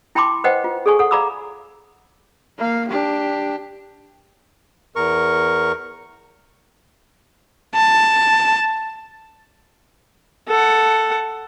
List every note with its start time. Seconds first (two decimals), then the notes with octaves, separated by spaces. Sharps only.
0.15 E4 G5 A5 B5 C6 D6
0.44 B4 C5 D#5 F#5 G5
0.64 F4
0.86 G#4 A4 D5 G#5 C#6
0.99 A4 F#5
1.11 D5 F5 A#5 B5 D6 E6
2.58 A#3 F5
2.88 D4 G4
4.96 E2 A#4 C#6
7.75 A5
10.48 A4 F#5